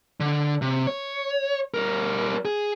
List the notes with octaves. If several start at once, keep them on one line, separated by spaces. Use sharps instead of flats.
D3
C3
C#5
G3 A#4
G#4